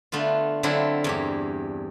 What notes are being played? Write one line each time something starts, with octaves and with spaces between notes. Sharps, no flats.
D3 A3 B3 F4
D3 F#3 C4 D4 E4 F4
E2 G2 G4